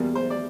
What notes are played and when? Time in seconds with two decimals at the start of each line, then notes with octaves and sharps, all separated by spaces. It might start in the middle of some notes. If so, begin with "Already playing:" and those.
Already playing: E2 B2 G3 A#3
0.15 C5
0.30 D5